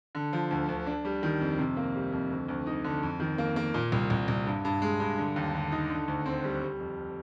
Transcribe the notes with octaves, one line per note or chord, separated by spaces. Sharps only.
D3
F3
D2
D2
D4
G3
D#3
F2
C3
A#3
G3
F2
D2
D2
D#4
D3
F2
D#3
A#3
A#3
A#2
C2
C2
C2
G2
G2
G#3
G2
D3
D#2
D3
D#4
D3
D2
C4
G3
G3
F2